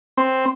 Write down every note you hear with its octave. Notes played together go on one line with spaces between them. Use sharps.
C4